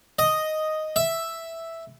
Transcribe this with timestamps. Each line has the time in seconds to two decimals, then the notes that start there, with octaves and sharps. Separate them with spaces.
0.19 D#5
0.96 E5